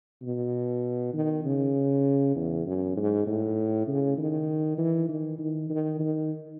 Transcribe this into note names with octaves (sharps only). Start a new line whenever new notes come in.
B2
D#3
C#3
E2
F#2
G#2
A2
C#3
D#3
E3
D#3
D#3
D#3
D#3